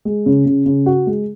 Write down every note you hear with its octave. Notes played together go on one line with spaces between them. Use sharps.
G#3
C#3
C#3
C#3
F#4
G#3